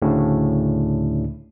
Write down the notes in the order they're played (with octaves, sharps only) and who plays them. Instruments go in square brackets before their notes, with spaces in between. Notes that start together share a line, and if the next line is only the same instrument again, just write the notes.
[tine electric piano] D2 A2 C#3 D4